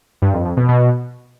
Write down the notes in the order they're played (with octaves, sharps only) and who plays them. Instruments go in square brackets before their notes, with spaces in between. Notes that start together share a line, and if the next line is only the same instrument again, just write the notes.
[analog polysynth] G2
F2
F2
B2
B2